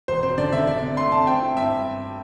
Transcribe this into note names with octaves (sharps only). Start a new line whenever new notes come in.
E1 C5
C4 C5
D3 D5
D3 E5
C3 D5
C3
A3 C6
C3 A5
C4 G5
E4
G2 E5